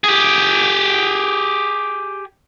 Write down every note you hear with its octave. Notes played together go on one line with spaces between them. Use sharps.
G4 G#4